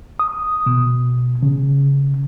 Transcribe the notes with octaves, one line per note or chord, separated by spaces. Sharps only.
D#6
B2
C#3